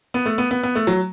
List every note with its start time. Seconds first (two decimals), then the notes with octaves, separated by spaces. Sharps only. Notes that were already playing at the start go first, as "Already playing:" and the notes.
0.14 B3
0.26 A3
0.38 B3
0.51 B3
0.63 B3
0.75 A3
0.87 F#3